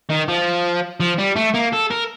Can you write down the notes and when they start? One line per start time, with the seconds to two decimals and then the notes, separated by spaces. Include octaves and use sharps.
0.09 D#3
0.28 F3
1.00 F3
1.19 G3
1.36 A3
1.54 A#3
1.73 A4
1.91 A#4